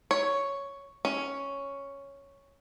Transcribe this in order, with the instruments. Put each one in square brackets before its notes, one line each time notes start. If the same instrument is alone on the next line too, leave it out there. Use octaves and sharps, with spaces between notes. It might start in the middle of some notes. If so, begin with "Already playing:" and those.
[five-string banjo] C#5
C#4